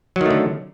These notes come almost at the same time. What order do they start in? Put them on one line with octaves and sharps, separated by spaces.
F#3 D#3 A3 D3